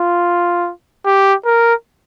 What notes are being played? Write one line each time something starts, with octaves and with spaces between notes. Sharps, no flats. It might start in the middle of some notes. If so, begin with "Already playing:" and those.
Already playing: F4
G4
A#4